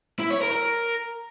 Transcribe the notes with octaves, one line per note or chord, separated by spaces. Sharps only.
E4
C#5
A#4
A#4